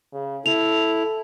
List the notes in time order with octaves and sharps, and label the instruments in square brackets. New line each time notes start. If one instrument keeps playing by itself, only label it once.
[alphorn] C#3
[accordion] E4 [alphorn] A4 [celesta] F7